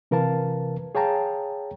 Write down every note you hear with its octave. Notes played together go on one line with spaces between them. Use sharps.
C3 E3 A#4 B4 F5 A5
G#4 C#5 F5 G5 A5 A#5